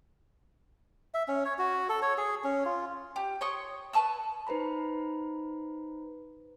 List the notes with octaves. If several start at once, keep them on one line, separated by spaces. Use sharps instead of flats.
E5
C#4
C#5
F#4
A4
C#5
G#4
C#4
F4
G4
C#5 C6 C#6 D#6
B4 A5 C#6 E6
D#4 B4 C5 A#5 B5